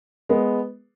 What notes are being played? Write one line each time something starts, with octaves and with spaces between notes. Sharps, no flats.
G#3 B3